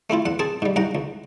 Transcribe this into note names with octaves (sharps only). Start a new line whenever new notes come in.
A3 C4 E4 F4
E2 F#5
C4 G#4 A5
G#2 G3
C2 G#2 F#5 G5 A#5
C#2